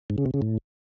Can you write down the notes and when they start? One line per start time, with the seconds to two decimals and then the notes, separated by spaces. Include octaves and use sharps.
0.10 G#2
0.18 C#3
0.26 C3
0.34 C#3
0.42 A2